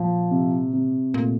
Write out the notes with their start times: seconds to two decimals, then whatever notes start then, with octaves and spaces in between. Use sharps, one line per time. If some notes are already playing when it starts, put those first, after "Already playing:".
Already playing: A#2 F3
0.31 C3
0.73 C3
1.14 A#2 A3